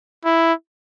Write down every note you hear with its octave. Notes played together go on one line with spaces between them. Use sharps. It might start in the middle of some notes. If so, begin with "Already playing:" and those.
E4